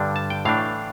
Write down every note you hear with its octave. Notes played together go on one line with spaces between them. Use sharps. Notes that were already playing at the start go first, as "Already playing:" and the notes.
Already playing: G2 D3 G3 D4
A5
G5
A2 E3 A3 D4 F5